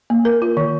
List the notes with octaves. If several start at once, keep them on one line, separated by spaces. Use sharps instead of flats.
A#3
A#4
F4
D#3